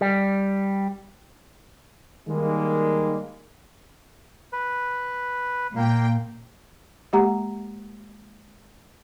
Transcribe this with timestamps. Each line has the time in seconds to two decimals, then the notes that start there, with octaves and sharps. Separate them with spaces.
0.01 G3
2.28 D#3 G3 G#3 A#3
4.53 B4
5.76 A#2 A#3 G5
7.13 G#3 A#3 G4 F#5 A#5